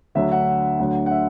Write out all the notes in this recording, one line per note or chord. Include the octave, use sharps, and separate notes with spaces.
D2 D3 F#3 E5
F#5
D2 D3 F#3
F#5
E5